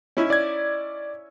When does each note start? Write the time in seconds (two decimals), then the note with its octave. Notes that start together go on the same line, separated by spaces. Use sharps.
0.17 C#4 D#4 E4
0.30 D5 G#6